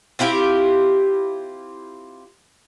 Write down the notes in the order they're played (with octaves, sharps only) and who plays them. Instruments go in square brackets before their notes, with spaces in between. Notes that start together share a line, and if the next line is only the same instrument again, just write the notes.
[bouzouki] C4 E4 F4 G4